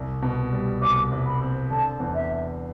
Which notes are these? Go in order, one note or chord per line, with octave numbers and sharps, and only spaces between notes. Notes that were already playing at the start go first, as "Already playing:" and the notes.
Already playing: C2
B2
G3
C2 D6
C2
B5
C4
D3 A5
E2
E5